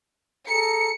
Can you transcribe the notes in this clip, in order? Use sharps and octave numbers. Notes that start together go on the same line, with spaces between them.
G#4 A4 A#5 C#7